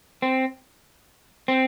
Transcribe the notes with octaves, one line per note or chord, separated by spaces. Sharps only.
C4
C4